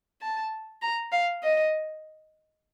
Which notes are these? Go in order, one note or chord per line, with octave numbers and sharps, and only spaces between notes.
A5
A#5
F5
D#5